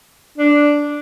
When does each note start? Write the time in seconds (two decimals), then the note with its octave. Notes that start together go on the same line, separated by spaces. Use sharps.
0.38 D4